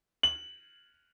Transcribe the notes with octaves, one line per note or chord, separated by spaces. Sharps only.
F#7